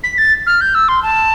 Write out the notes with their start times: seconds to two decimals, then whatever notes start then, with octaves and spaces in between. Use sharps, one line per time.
0.03 B6
0.18 A6
0.46 F6
0.61 G6
0.74 E6
0.88 C6
1.02 A5